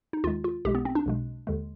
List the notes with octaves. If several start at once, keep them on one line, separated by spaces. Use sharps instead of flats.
D#4
D#2 D#3 G#3 F4
F4
B1 B2 G#3 G4
B3
C4
D4
B1 B2 G#3
D#2 D3 G#3